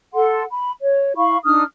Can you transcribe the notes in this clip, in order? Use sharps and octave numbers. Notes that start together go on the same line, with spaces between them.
A4 F#5 C6
B5
C#5
E4 F5 B5 C#6
D4 D#4 D#6 F6